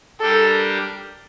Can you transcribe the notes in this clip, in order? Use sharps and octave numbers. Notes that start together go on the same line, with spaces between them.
G3 D4 G4 A4 A#4